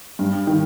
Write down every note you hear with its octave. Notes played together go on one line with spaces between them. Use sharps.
G2
D#3